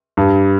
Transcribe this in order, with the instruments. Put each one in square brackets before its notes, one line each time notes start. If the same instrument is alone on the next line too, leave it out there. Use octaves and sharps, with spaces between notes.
[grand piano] G2